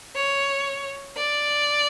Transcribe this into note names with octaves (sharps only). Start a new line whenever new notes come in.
C#5
D5